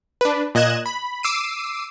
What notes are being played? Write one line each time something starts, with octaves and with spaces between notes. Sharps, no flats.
D4 B4
A#2 D#5 F#6 G#6 E7
B5
D6 E6 C7 D#7